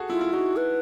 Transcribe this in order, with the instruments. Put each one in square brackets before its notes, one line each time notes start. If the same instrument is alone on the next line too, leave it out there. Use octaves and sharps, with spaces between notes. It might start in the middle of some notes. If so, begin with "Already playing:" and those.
Already playing: [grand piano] F#4 G#4 A4
[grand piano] E4 [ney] F4
[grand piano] E4
[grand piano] D#4 [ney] F#4
[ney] B4